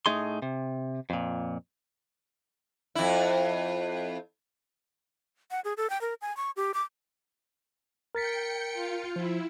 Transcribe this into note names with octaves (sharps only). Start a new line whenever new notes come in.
A2 A3 D#4 G#4 C6
C3
F2 A#2
F2 E4
F#5
G#4
A4
G5
A#4
G#5
C#6
G4
D6
A#4 G5 A6 B6 C#7
F4
F3 E4